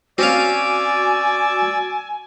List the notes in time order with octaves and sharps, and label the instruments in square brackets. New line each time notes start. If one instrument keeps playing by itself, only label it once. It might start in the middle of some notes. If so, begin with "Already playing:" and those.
[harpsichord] C4 C#4 F5 [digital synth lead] F#4 [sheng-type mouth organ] D5 D6 E6 [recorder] G#5